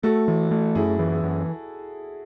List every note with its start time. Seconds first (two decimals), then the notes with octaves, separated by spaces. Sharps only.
0.03 A3 F#4 A4
0.28 E3
0.51 A3
0.75 F#2 E4 G#4
0.99 E3
1.24 F#2